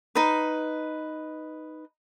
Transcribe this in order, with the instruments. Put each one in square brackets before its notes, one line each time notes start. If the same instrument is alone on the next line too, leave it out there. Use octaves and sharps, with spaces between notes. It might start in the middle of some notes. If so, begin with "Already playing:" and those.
[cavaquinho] D#4 B4